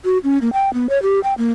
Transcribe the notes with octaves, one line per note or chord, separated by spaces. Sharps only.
F#4
C#4
A#3
G5
B3
C#5
G4
G5
A#3